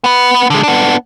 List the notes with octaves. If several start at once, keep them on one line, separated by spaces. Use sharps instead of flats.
B3 B4
D3 G#3
B3 D4